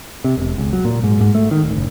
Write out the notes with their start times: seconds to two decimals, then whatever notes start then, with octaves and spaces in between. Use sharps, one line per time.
0.24 C3
0.38 E1
0.58 C#2
0.73 F#3
0.85 A#2
1.04 G#2
1.21 G#2
1.35 A3
1.51 D#3
1.63 D#1
1.76 F#1